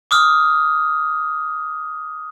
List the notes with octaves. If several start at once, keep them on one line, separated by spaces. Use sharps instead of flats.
D6 D#6 F6